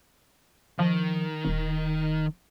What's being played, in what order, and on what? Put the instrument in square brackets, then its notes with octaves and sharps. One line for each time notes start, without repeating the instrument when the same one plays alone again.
[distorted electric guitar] D#3 [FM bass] F3
[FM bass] D#1